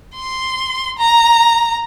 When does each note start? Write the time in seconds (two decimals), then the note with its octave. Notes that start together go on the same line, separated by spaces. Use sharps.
0.16 C6
0.98 A#5